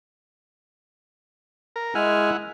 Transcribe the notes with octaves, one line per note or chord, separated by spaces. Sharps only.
A#4
G#3 E4 F#5 G#5 F6